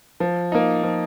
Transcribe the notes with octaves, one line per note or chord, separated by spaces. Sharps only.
F3
A#3 D#4
F3